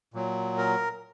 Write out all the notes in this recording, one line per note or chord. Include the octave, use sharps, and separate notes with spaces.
A#2 F#3
A#4